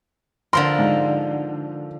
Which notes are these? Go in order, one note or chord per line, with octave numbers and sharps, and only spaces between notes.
D3 F3 A#4 C6
G#2